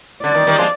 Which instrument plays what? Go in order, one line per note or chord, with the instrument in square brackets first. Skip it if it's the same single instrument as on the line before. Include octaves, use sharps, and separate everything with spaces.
[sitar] D3 [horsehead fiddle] D5
[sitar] D#3
D#3 G3
F3 G#3